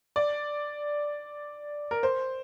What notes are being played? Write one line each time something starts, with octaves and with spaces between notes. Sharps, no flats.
D5
A#4
C5